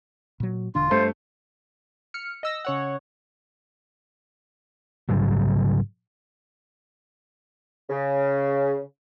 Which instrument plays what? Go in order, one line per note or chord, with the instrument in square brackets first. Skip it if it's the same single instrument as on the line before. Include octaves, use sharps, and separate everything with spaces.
[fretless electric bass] A#2 F#3
[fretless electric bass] E1 D3 D4 [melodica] F4
[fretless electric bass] G2 [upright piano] A3 [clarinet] C5
[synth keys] F6 C#7
D#5 E6 A#6
C#3 C#5 F#5
[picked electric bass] G#2 C#3 F#3 G3
[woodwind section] C#3